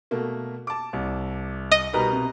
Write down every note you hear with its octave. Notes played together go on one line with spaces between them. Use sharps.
B2 A3 A#3
A5 D6
C2
D#5
B2 G3 D#4 A#4 B4 A#5
C3